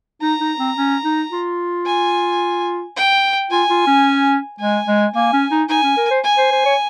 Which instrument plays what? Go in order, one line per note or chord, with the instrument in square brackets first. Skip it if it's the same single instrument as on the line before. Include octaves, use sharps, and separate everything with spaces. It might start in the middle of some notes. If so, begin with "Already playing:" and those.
[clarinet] D#4 [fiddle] A#5
[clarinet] D#4
C4
C#4
D#4
F4
[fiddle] G#5
G5
[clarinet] F4 [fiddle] G#5
[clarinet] F4
C#4
[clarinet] G#3 [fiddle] G#5
[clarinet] G#3
[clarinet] A#3 [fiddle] G#5
[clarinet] C#4
D#4
[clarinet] D#4 [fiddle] G#5
[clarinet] C#4
A#4
C5
[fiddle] G#5
[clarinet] C5
C5
C#5